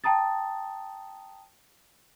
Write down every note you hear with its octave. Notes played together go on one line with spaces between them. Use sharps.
G5 A5 A#5 D#6 A6